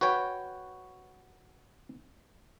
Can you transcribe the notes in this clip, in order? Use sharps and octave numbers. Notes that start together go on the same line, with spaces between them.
F#4 B4 C#5 G5